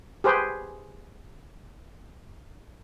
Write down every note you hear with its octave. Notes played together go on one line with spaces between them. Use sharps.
G4 G#4 B4 C5